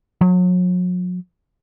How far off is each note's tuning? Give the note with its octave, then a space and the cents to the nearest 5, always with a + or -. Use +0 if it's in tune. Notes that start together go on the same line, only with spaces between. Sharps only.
F#3 -40